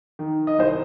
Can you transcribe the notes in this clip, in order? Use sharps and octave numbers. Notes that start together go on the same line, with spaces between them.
D#3
D#5
C2 C5